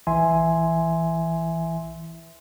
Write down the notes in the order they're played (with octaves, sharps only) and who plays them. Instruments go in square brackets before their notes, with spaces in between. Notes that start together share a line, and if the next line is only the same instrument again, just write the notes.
[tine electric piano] A#1 E3 E5 G#5 C6